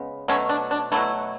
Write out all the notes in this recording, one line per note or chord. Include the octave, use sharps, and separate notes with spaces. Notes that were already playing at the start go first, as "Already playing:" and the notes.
Already playing: C#3 G#3 B3
B2 F#3 A3 C#4
D4
D4
B2 F#3 A3 E4